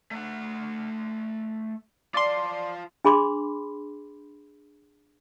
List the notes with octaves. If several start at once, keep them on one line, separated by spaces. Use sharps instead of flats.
A3 F#5
F4 D5 A5 C6
D4 G#4 B5 C6 D6